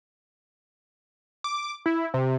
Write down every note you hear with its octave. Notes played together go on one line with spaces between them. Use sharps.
D6
E4
C3